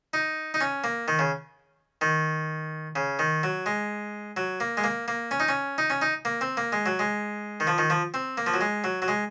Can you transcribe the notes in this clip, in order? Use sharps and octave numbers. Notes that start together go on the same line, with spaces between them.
D#4
D#4
C#4
A#3
D#3
C#3
D#3
C#3
D#3
F#3
G#3
F#3
A#3
G#3
A#3
A#3
C#4
D#4
C#4
D#4
C#4
D#4
A#3
C4
A#3
G#3
F#3
G#3
D#3
F3
D#3
F3
C4
A#3
F3
F#3
G#3
F#3
F#3
G#3